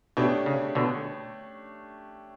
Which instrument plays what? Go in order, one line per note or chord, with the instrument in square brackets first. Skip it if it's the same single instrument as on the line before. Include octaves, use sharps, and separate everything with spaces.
[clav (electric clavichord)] B2 [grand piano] A3 D4 G4 C#5
[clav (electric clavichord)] C#3
B2 D3